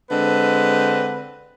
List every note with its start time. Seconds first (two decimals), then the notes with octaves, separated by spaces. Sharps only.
0.10 D3 G#3 C4 B4